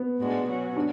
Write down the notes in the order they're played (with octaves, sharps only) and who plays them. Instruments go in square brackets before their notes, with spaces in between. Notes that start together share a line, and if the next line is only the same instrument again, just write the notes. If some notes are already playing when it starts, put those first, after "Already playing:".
Already playing: [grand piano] B3
[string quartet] A2 G#3 D4 F#4
B2 F#3 C#4 F#4
[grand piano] D4